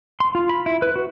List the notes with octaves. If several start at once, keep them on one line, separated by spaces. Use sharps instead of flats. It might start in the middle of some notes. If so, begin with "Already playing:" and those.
C6
F4
B5
E4
B4
F#4